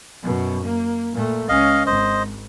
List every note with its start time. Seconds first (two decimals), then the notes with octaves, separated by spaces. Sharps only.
0.23 F#2 B2
0.64 A#3
1.13 A#2 A3
1.49 C#2 C#4 D#5 F5
1.86 G#1 C5 D#5